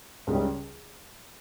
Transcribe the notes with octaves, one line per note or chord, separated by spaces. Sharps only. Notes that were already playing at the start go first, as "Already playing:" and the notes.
C#2 C#3 G3 C#4